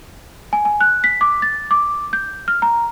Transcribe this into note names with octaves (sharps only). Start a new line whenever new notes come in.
G#5
G#5
F#6
B6
D6
A6
D6
G6
F6
A#5